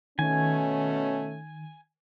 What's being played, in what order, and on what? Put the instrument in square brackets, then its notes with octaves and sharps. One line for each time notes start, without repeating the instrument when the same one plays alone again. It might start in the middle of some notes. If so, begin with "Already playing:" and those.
[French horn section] B2 A3 C#4 [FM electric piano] D#3 [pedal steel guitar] G#5